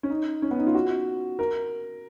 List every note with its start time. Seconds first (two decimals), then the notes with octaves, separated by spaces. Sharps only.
0.03 C#4
0.10 D#4
0.42 C#4
0.51 B3
0.59 D#4
0.67 F4
0.75 F#4
1.39 A#4